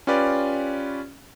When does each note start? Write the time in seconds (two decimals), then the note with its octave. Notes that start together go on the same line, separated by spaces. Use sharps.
0.07 C#4 F4 G4 B4 D5